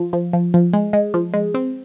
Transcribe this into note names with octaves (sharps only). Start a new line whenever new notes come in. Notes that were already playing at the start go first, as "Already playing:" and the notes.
Already playing: F3
F3
F3
F3
G#3
G#3
F3
G#3
C4